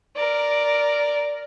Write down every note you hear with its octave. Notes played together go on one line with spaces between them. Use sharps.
A#4 D5